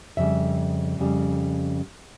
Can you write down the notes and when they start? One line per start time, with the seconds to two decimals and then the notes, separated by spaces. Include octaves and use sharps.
0.17 F2 C#3 G3 E5
0.99 F2 C#3 G3